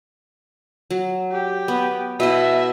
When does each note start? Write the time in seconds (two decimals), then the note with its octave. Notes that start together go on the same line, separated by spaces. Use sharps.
0.91 F#3
1.32 G4
1.68 B3
2.20 B2 E4 D#5 E5